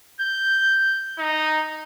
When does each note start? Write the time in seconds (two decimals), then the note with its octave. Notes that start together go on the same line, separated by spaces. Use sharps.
0.21 G6
1.18 D#4